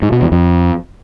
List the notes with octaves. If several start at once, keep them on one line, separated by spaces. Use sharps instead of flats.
G#2
B2
E2
F2